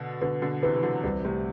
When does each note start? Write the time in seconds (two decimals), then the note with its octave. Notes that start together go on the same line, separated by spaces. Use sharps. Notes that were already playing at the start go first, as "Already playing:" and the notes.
Already playing: B2 D3
0.21 B2 D3 B4
0.42 B2 D3
0.63 C3 E3 B4
0.76 E3
0.83 D3 F#3
1.04 C2 C3 E3
1.24 A2 C3